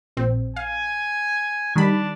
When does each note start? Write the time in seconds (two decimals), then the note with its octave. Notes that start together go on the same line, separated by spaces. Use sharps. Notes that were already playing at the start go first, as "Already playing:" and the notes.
0.17 A#1 C4
0.56 F5 G#5
1.76 D#3 G3 D4 B5